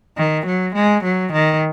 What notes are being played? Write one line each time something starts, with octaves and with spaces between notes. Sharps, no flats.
D#3
F#3
G#3
F#3
D#3